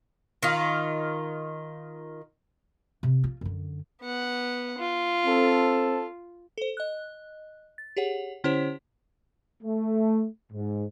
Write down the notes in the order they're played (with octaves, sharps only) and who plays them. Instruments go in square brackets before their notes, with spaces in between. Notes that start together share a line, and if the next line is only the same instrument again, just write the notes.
[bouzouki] D#3 F4
[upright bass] C3
F4
F#2 D3
[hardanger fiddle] B3 F#5
F4
[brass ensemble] C4 A4
[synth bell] A4 C5
D#5 F#6
A6
G4 G#4 C#5 F#5
D3 C#4 E4 G4 C5 C#5
[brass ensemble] A3
G#2